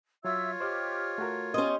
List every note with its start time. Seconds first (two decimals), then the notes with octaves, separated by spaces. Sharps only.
0.25 F#3 F4 C#5 E5 E6
0.60 G4 C5 D#5 D6 F6
1.18 A3 F#4 A#4
1.54 C#4 G4 D#5 C6